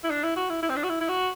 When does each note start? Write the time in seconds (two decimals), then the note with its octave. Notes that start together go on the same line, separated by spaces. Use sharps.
0.03 E4
0.10 D4
0.24 E4
0.36 F#4
0.49 E4
0.62 E4
0.69 C4
0.76 D4
0.84 F#4
0.89 E4
1.00 E4
1.08 F#4